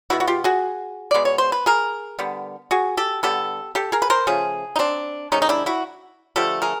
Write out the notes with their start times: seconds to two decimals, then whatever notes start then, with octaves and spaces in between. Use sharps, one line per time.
0.10 B2 G#3 B3 E4 F#4
0.20 F#4
0.27 F4 G4
0.44 F#4 G#4
1.11 B2 G#3 B3 D5
1.25 C#5
1.38 C5
1.52 B4
1.66 G#4 A#4
2.19 D3 G3 B3
2.71 F#4 G#4
2.97 G4 A4
3.23 D3 G3 B3 G4 A4
3.75 G4 A4
3.92 G#4 A#4
4.02 B4
4.10 A#4 C5
4.27 C#3 F3 A3 G#4
4.76 D#4
4.79 C4 D4
5.32 C3 D#3 G#3 C#4 D#4
5.42 D#4
5.49 D4 E4
5.66 E4 F#4
6.36 D3 F3 A3 G4 A4
6.62 G#4 A#4